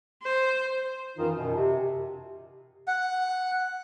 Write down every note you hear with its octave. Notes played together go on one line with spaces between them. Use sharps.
C5
F#2 D#3 E3 D#4 F4
F#2 B2
C3
F#5